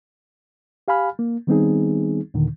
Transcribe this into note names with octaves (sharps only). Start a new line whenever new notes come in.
G4 F5 G#5 B5 F6
A#3
D#3 G3 B3 C4 D#4 G#4
D#2 A#2 D3 D#3